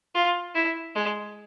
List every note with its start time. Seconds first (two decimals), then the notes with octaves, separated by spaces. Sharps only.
0.15 F4
0.55 E4
0.95 G#3